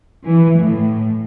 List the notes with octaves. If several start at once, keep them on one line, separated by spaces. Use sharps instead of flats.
E3
A2